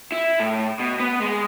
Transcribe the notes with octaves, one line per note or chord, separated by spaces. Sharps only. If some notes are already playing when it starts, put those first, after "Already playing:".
E4
A2
B2
B3
G#3